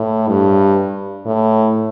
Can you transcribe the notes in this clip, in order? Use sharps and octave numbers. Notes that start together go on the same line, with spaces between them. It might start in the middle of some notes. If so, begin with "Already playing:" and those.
Already playing: A2
G2
A2